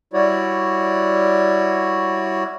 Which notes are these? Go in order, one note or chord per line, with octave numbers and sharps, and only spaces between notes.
G3 E4 F#4 C#5 D5